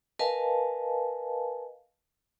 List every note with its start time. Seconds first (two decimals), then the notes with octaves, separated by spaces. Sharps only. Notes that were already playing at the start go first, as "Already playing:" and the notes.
0.19 A#4 B4 D#5 F5 G#5 A5